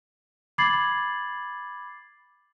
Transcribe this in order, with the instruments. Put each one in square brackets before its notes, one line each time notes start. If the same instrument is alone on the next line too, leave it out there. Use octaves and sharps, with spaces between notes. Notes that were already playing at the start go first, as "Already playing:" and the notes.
[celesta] B5 D6 G#6 A6 C7 F#7